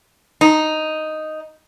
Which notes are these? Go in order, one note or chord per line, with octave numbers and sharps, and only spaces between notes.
D#4